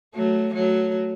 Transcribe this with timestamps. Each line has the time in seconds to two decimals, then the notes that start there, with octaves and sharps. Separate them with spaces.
0.15 F#3 A3
0.54 F#3 A3